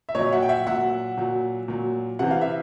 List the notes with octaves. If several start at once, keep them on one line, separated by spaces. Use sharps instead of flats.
E5
A#2 F#3 C#5 D#5
E5 F#5
G5
E5 F#5
A#2 F#3 E5 F#5
A#2 F#3
A#2 F#3
C3 E3 F#5
F5
E5